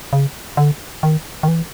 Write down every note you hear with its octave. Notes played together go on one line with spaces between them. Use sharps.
C#3
D3
D#3
D#3
E3